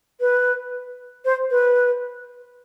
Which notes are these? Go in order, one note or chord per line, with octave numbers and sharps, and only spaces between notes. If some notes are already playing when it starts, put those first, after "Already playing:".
B4
C5
B4